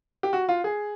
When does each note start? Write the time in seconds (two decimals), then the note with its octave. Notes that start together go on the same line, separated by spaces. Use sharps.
0.23 G4
0.33 F#4
0.49 F4
0.64 G#4